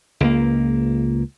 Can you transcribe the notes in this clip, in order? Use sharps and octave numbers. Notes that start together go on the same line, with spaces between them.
C#2 A#3